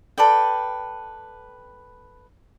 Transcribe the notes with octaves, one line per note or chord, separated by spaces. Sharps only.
A4 B4 D5 G5